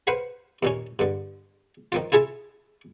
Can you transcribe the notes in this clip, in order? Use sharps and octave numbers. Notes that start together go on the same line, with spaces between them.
B4 C5 F5 F#5 B5
D#2 A#2 C#4
G2 D3
D#3 F3 F4
E4 F4 G#4 A4 E5